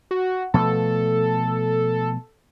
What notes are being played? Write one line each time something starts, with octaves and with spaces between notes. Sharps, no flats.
F#4
B2 F3 A3 A4